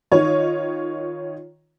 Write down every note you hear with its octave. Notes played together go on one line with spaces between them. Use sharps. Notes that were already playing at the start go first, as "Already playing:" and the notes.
D#3 F4 C#5 D#5